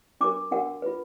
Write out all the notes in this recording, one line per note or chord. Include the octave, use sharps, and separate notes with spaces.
D4 F#4 A#4 D6
D4 F#4 A#4 F#5
F4 B4